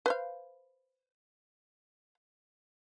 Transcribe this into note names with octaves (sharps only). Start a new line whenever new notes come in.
B4 C5 F5